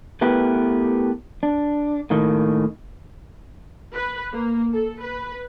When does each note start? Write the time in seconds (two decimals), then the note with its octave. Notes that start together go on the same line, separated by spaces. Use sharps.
0.21 A3 B3 E4 G4 A#4 B4
1.43 D4
2.10 A2 D#3 A#3
3.93 B4
4.32 A#3
4.72 A4
5.01 B4